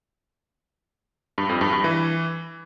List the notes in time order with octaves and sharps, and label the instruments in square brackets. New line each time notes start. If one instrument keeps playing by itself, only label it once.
[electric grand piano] G2
F2
G2
G2
E3